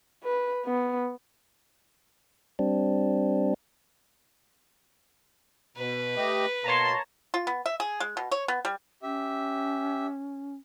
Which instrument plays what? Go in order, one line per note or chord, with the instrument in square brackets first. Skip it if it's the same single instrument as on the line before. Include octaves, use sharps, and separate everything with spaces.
[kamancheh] B4
B3
[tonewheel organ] G3 C4 D4
[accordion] B2 [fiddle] B4
[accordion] A3 G4 D#5
[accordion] B2 [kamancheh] A#3 C6 [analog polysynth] C#5 A5 A#5
[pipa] F4
B3
E5
G#4
G#3
B2
C#5
B3
G3
[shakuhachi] C#4 [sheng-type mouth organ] G4 E5